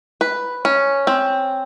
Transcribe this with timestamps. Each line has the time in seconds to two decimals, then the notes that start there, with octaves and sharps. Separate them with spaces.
0.21 B4
0.65 C#4
1.07 C4